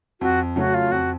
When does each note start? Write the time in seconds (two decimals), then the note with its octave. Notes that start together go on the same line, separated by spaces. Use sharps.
0.21 F2 F#4
0.56 C#3 F#3 A3 C#4 F#4
0.74 F4
0.92 F2 F#4